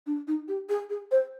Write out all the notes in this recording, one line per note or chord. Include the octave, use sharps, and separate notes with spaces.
D4
D#4
G4
G#4
G#4
C5